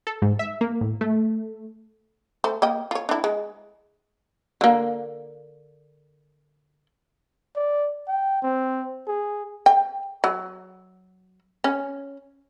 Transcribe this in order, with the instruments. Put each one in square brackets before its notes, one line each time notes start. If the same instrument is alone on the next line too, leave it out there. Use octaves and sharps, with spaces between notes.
[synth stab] A4
G#2
E5
A#3
A2
A3
[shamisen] A3 C5
A#3 D#5 G5
F4 C#5
D4 E4
G#3
D3 A#3
[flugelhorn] D5
G5
C4
G#4
[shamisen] G5
F#3
C#4